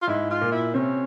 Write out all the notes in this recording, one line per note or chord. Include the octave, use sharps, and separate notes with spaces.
F4
G#2 G#3 E4
F4
A#2 A#3
E4
C3 C4 C#4